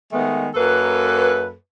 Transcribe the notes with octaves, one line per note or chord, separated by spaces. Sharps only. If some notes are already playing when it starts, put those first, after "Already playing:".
D#3 G#3 A3 B3
F#2 A#3 A4 B4